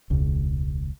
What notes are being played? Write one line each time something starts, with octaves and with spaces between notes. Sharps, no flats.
E1 C#2